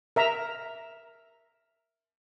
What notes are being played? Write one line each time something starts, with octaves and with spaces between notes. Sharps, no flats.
A#4 E5 A#5